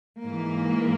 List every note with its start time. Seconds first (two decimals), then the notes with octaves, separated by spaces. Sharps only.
0.23 G#2 E3 A#3